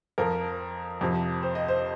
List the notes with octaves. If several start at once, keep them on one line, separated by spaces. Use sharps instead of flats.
F2 F3 A#4
F2 C3 F3
C5
D#5
C5